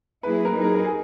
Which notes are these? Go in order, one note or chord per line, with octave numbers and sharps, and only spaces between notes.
F#3 A#3 E4 G#4 B4
A#4
F#3 A#3 D#4 G#4 B4
A#4
A#4
G#4